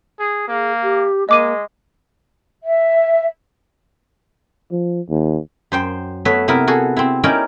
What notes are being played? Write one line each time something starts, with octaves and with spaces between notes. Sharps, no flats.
G#4
A#3 G#4
G4
G#3 A#3 D#5 D6 D#7
E5
F3
D#2
F#2 C5 G5
A3 B3 B4 C#5 E5
C3 B3 E4 A#4
F#4 G#4 A4
C4 E4
C#4 D#4 E4 A#4 D5 G5